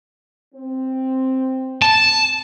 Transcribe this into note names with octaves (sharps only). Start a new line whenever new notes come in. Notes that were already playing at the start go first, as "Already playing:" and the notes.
C4
A5